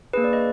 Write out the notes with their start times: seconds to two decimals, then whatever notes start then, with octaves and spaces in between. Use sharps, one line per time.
0.13 A#3 D4 G#4 B4
0.24 D5
0.33 B4 D#5